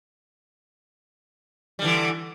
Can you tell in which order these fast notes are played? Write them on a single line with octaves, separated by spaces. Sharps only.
G3 D3 E3